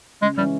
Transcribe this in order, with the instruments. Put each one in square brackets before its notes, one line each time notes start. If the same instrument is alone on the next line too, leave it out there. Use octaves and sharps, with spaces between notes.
[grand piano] C#3 [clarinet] G#3
[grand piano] E3 G#3 C#4 [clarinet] G3